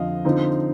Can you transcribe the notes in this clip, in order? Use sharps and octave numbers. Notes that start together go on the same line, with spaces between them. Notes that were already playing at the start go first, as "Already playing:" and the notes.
Already playing: F2 D3 F3 C4 D#5 F5
D3 F3 C4 D#4